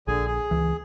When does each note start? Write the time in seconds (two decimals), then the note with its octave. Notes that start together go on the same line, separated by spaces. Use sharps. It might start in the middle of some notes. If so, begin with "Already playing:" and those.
0.07 A#1 D3 G#4 G#5
0.27 G#4
0.51 C#2 E3